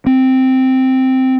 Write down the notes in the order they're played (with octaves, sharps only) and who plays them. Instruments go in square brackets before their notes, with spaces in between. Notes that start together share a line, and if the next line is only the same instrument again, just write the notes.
[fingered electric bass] C4